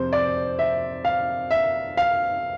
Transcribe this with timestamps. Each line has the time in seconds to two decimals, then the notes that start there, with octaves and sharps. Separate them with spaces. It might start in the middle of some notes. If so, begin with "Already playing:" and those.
Already playing: F2 C3 C5
0.13 D5
0.59 E5
1.05 F5
1.51 E5
1.97 F5